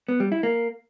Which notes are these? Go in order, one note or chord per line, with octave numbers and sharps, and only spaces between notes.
B3
G3
E4
A#3